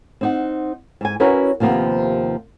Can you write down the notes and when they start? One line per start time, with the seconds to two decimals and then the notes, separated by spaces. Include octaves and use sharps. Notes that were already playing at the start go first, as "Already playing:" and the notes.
0.21 C4 D#4 F#5
1.01 G#2 G#5
1.20 C#4 E4 F#4 A#4 B4 C#5
1.60 D#2 C3 F3 A#3 B3